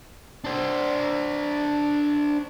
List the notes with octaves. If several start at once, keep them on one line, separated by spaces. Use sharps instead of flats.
D4 C5